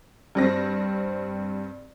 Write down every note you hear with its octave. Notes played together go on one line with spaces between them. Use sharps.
G2 C4 A#6